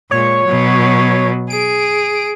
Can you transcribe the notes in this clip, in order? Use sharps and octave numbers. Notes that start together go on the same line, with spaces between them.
A#2 G#3 C#5
B2 F#3
G#4 D7